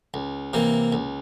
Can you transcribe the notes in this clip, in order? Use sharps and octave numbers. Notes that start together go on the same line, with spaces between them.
C#2
C3 E3 A#3
C#2